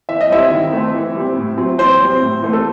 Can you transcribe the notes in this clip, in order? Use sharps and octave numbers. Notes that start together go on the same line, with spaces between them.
E3 E5
D#5
G3 C4 E4 E5
D#3
A3 C4
E3
G3 C4
A2
F#3 C4
E3 C4 C5
G3 C4
A2
E3 A3 C4
A4